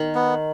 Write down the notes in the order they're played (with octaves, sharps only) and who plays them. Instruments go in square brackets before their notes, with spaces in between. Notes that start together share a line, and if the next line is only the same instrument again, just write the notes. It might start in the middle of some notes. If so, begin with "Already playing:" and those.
Already playing: [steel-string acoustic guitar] D#3
[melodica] B3